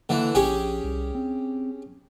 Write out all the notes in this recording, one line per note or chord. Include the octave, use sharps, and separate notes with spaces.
D3 E3 A#3
A#1 C#4 G4 G#4
C2
C4